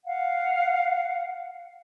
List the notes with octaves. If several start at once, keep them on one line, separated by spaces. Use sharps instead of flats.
F5 F#5